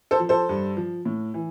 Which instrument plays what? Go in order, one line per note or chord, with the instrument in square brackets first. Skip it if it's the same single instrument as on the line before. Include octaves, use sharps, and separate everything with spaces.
[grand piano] A4 C5
F3
A4 C5
G2
F3
A2
E3